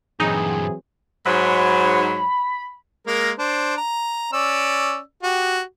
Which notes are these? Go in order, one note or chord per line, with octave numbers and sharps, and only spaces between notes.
G2 A#2 E3 F#3 C4 D#4 G#4
G#2 F#3 B5
G#3 A#3 A#4
D4 C5
A#5
C#4 D5 E6
F#4 G4